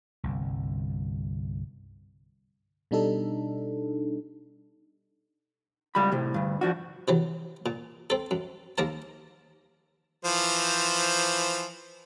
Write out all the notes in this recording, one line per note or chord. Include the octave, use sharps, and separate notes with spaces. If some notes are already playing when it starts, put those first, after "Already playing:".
G1 C2
B2 G3 D4 D#4 A4
C#2 G3 B5
A2 C3
D2 G2
F3 D4 F#4
C3 E3 F#3
A#2
C4 A4
F#2
D#2 A#3 A#4 A5
E3 F3 C5